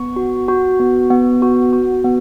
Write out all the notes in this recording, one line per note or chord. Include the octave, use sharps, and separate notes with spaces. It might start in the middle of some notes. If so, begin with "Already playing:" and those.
Already playing: B3 C#6
F#4
F#4
B3
B3
F#4
F#4
B3